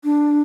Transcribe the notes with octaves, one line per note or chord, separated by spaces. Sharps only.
D4